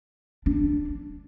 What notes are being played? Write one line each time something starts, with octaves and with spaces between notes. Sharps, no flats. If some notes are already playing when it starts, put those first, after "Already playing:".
D4